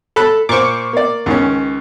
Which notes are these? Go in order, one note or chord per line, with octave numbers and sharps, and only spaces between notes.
A4 B5 F#6
A#2 C5 C#6 D6
A#3 D5
C#2 D#3 C#4